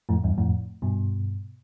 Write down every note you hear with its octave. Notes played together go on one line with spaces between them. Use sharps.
F2 A2
E2 G2
F2 A2
G2 B2